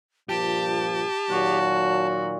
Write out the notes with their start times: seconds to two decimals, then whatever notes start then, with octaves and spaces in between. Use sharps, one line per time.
0.29 G2 A#2 F3 G4 A5
1.30 A#2 D#3 F#3 F#4